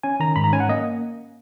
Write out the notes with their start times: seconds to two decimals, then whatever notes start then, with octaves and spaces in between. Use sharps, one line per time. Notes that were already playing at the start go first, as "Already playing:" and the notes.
0.03 C#4 G#5
0.20 D#3 A#5
0.36 G#2 B5
0.44 A#5
0.53 C#4 G#5
0.60 F#5
0.69 A#3 D#5